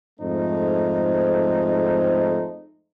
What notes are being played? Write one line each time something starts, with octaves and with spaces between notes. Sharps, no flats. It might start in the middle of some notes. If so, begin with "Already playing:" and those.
F2 G#2 A3 D#4 C5